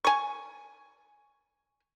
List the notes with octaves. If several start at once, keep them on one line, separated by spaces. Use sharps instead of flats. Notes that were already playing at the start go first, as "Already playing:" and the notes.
G#5 C#6